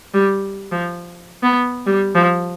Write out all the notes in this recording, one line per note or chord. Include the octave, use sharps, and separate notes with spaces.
G3
F3
B3
G3
F3